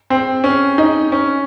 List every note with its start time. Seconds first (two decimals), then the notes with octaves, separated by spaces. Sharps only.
0.10 C4
0.44 C#4
0.78 D#4
1.12 C#4